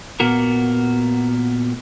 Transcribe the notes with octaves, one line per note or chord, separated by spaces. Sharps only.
A#2 A#3 B3 F#4 A#4